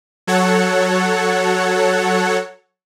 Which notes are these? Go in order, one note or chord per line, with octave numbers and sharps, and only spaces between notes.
F#3 A4 C#5 F#5